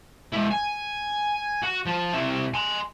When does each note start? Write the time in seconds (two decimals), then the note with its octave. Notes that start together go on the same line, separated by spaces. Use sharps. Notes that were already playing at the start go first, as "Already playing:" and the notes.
0.34 G#3 E4
0.52 G#5
1.64 F#4
1.87 F3
2.14 C3 E4
2.54 G#5 C6